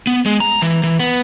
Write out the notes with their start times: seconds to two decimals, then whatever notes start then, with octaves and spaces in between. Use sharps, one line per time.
0.07 B3
0.26 G#3
0.40 A#5
0.62 E3
0.84 E3
1.00 B3